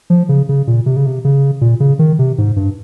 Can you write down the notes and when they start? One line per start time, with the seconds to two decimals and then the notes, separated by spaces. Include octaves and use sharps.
0.10 F3
0.29 C#3
0.49 C#3
0.67 A#2
0.86 C3
0.96 C#3
1.06 C3
1.25 C#3
1.61 A#2
1.80 C#3
1.99 D#3
2.19 C3
2.38 G#2
2.56 G2